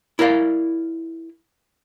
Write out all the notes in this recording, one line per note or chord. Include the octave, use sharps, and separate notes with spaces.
E4 A#4 D5 F5